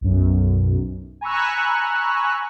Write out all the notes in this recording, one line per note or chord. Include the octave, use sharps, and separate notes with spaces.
B1 F#2
G#5 A#5 B5 C#6 E6 F#6